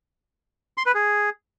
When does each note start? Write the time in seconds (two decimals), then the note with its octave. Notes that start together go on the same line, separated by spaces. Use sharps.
0.78 C6
0.86 B4
0.95 G#4